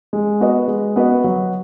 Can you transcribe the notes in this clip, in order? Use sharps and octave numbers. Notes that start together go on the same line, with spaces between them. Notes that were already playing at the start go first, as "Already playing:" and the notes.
G#3
B3 F#4 B4 D#5
G#3
B3 F#4 B4 D#5
F#3